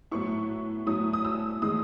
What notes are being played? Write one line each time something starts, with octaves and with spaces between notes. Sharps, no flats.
A2 F#3 B3 E4 C#6
A2 F#3 B3 E4 D#6
D#6
E6
A2 E3 G#3 D#6